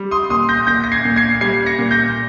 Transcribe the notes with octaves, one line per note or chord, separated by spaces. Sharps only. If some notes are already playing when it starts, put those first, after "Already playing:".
Already playing: G3
C6 D#6
A#2 C6 D#6
G6 A#6
A#2 G6 A#6
A#6
G#6 C7
A#2
G#6 C7
G3 G#6 C7
A#6 C#7
A#2
G6 A#6